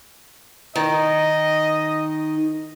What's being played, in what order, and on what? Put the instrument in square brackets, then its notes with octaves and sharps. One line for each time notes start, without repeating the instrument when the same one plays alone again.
[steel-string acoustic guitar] D#3 [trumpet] D#5